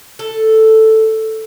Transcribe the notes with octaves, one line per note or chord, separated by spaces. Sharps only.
A4